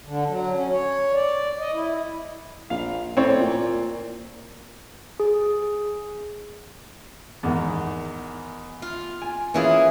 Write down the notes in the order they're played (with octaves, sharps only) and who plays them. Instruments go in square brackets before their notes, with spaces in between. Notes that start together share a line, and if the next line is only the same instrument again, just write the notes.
[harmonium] D3
F#3
C#4
C#5
D5
D#5
E4
[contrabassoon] A#1 [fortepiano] F5
[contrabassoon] A2 [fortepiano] C4 C#5 D5
[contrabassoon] A#2
[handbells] G#4
[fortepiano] E2 G#2 D#3
[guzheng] F4
[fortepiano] G#5
[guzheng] E3 E4 G#4 [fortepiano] A#3 C#4 F4